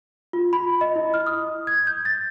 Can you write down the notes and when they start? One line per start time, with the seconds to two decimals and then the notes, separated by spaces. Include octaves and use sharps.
0.33 F4
0.53 B5
0.81 D#5
0.96 E4
1.14 F6
1.27 D#6
1.67 G#6
1.87 G6
2.05 A6